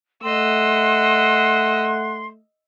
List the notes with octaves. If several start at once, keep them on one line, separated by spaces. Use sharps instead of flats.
A3 D#5 F#5 C6 E6